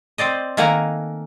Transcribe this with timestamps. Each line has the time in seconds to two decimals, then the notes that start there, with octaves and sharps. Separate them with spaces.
0.18 C4 C5 D5 D#5
0.57 D#3 A3 A#3 F#5 G#5 A#5